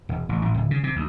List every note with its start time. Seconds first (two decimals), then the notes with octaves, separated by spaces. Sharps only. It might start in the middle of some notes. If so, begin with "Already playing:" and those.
0.09 E1
0.29 A1
0.42 A1
0.54 D1
0.71 C#3
0.83 C3
0.96 D2